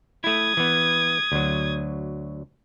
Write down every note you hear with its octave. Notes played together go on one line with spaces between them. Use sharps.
A3 E4 D#6 G#6
E3 B3
D2 F#3